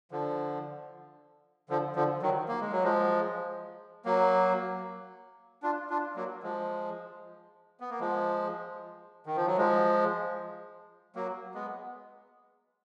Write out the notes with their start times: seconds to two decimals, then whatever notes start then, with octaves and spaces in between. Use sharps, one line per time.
0.11 D3 F3
1.69 D3 F3
1.96 D3 F3
2.22 D#3 F#3
2.48 A#3
2.60 G#3
2.72 F#3
2.84 F3 G#3
4.05 F#3 A#3
5.63 D4 F4
5.90 D4 F4
6.16 F#3 A#3
6.43 F3 G#3
7.80 B3
7.90 A#3
8.00 F3 G#3
9.26 D#3
9.36 F3
9.46 F#3
9.57 F3 G#3
11.16 F#3 A#3
11.54 G#3 B3